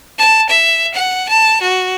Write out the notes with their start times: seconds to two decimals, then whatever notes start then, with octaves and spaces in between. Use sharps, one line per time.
0.19 A5
0.49 E5
0.94 F#5
1.29 A5
1.62 F#4